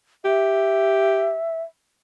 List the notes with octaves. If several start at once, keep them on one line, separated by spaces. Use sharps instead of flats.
G4 E5